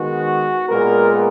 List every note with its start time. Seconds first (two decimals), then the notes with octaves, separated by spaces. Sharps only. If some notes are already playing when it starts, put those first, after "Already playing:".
Already playing: D#3 G#3 B3 F#4
0.68 A#2 G#3 B3 A#4